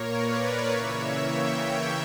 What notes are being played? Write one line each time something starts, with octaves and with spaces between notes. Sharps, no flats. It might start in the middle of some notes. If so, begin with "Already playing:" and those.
Already playing: A#2 A#3 A#4 C#5
B4 D5
C#3 E3 A#3 C#5 E5
E5 G5